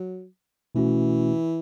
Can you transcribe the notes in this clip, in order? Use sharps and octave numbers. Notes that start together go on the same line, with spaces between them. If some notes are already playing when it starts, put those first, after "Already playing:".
Already playing: F#3
B2 E3 A3 C#4 F#4